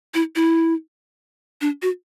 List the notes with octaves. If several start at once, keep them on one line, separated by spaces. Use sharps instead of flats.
E4
E4
D4
F#4